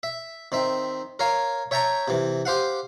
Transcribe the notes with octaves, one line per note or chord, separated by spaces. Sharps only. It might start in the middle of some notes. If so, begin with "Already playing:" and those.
E5
D#3 C4 E5
A#4 C#5 F5
C#5 E5 G5 A5 A#5 C#6
C3 E3
G4 C5 F5 F#5